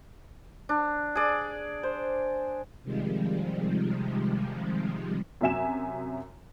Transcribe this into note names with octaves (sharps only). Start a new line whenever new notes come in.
D4
G#4 D5
C5
C3 D#3 F3 G3 G#3
F#2 C3 F#3 E5 G#5 E7